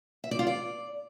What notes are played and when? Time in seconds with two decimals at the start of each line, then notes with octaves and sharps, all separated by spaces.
0.24 E5
0.31 D5
0.39 F4
0.47 D5